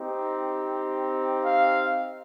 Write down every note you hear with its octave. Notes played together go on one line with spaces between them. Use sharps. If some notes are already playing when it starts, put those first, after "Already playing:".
Already playing: C4 D#4 G4
F5